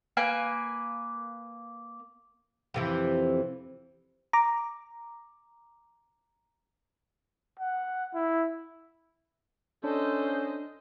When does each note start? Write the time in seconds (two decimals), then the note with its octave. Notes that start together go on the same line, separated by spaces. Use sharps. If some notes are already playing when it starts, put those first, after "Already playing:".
0.17 A#3 B4 G#5
2.74 F2 C3 E3
4.33 A#5 D6
7.59 F#5
8.14 E4
9.84 C#4 D4 A4 C5 D#5